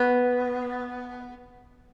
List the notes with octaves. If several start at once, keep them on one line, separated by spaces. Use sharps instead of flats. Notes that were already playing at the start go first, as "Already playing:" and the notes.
Already playing: B3